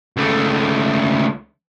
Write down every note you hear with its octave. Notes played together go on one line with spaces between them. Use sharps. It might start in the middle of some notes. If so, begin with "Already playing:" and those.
C#2 A3